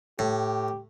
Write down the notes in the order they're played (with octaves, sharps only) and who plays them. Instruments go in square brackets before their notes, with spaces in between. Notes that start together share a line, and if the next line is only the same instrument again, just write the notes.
[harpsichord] A2 [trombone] G4